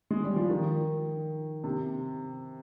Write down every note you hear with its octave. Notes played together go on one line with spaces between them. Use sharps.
G#3
G3
F3
D#3
C3